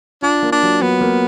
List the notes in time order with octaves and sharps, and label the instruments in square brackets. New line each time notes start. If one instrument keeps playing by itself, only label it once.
[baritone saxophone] D4 [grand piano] F4
[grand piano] A#3
[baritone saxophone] D4
[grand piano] F#3
[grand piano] F#3 [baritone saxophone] B3
[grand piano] A#3